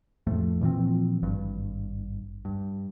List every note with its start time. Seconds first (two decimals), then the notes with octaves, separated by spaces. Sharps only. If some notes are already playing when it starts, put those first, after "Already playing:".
0.27 F2 A2 F3 A3
0.61 A#2 E3 F3 C4
1.22 G#1 G2
2.45 G2